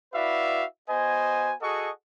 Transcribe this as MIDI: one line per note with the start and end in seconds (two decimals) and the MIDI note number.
0.13 0.64 64
0.13 0.64 66
0.13 0.64 71
0.13 0.64 74
0.13 0.64 76
0.13 0.64 77
0.88 1.53 59
0.88 1.53 66
0.88 1.53 72
0.88 1.53 75
0.88 1.53 80
1.61 1.89 66
1.61 1.89 68
1.61 1.89 69
1.61 1.89 75
1.61 1.89 78
1.61 1.89 85